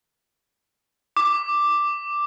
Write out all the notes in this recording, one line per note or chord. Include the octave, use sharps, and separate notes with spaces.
D6